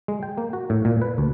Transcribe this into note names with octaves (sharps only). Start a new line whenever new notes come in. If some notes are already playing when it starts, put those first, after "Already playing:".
G#3
G5
A#3
F#4
A2
A#2
B4
D2